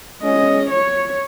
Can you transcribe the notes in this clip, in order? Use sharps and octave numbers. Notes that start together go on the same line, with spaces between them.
G#3 C#4 D#5
C#5